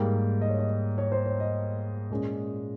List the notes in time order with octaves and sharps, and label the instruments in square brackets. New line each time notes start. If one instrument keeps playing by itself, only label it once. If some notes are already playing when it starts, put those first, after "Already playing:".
Already playing: [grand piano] G#2 G3 A#3 G5
D#5
C#5
D#5
C#5
C5
C#5
D#5
A#2 G#3 C#4